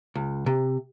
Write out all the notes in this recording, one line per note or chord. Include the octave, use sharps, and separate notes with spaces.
C#2
C3